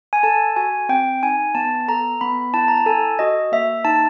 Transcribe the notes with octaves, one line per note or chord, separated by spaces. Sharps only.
G#5
A4 A5
F#4 G#5
C4 G5
D#4 G#5
B3 A5
A4 A#5
B3 B5
E4 A5
A#5
A5
A4 G#5
F#4 D#5
A#3 E5
D#4 A5